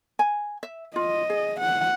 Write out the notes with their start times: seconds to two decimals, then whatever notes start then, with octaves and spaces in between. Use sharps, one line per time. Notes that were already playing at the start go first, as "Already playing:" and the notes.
0.19 G#5
0.63 E5
0.96 F4 D#5
1.30 G#4
1.61 F#5